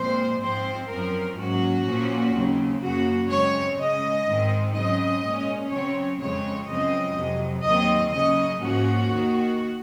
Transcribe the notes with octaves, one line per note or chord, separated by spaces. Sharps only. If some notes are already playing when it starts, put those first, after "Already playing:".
Already playing: A#2 F3 G#3 C4 C5
G#2 F3 C4 C5
F#2 F3 C4 A#4
G#2 F#3 A#3 C#4 F#4
A#2 F3 A#3 C#4
D#2 C#3 F#3 C4
F#2 C#3 F#3 A#3 C#4 F#4
C#3 G#3 C4 C#5
C#3 G#3 C#4 D#5
G#2 D#3 G#3 C4
C#3 F#3 C4 D#5
A#2 G#3 C#4
C#3 F#3 C4 C#5
F2 C#3 G#3 C4 C#5
F#2 C#3 F3 G#3 C4 D#5
F2 C3 F#3
D#2 D#3 F#3 C4 D#5
C#3 F#3 C#4 D#5
G#2 F3 A#3 C#4 F#4
D#2 D#3 A#3